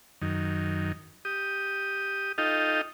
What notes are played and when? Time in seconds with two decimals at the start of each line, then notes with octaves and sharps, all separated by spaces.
0.22 F#2 D#3
1.25 G4 D#6
2.38 D#4 F4 A4 D#5 F5 G5